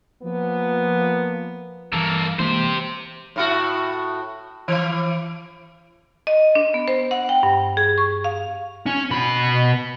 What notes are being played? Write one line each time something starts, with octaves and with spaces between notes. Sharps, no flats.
F3 A#3 B3
G2 E3 A#3 A4
E3 G#3 A#3 G4 C5
A2 E4 F#4
E3
D#5
D4
B3
C5
F#5
G5
G2
G#4
C#6
F5
C#4
B2 B5